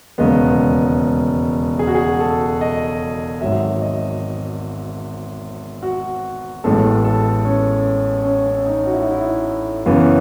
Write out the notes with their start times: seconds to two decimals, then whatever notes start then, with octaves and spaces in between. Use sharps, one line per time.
0.18 E1 D#2 C#3 G#3 B3 D#5
1.79 G#4
1.87 F#4
1.95 G#4
2.20 A4
2.61 D#5
3.41 G#1 G#2 F#3 E5
3.82 D#5
5.83 F#4
6.64 A1 A2 G#3 B3 A4
7.04 A4
7.45 C#4
8.25 C#4
8.46 C#4
8.66 D#4
8.86 F#4
8.93 E4
9.02 D#4
9.11 E4
9.86 F#2 C#3 E3 B3